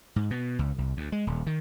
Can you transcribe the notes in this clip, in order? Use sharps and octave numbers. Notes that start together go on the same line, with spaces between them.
G#2
B2
C#2
C2
D2
G#3
D#1
D#3